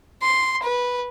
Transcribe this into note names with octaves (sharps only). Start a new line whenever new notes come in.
C6
B4